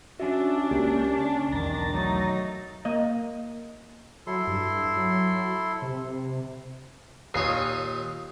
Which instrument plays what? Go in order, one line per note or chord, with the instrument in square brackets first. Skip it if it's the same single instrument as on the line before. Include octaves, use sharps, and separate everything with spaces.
[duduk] C#4 [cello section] D4 [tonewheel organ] F#4 E5
[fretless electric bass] C#2 [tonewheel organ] A#3 G4
[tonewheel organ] A5
[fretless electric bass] B1 E2 [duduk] D#3 [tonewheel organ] A#5 A6
[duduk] F#3 [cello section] A3 D#4
[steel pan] A#3 D#5
[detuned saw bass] F#3 [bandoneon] E4 A4 C6
[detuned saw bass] G2
F#3
C3
[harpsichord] D#2 A#2 C#5 [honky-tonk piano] D#6 C7